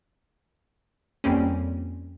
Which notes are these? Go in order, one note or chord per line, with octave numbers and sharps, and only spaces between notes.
F2 G3 A#3 C4 C#4